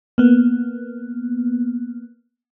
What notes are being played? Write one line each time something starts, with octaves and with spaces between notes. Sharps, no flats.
A#3 B3